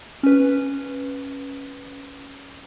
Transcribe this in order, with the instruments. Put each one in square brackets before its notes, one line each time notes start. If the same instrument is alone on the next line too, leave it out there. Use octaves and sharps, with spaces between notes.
[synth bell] C#4 B4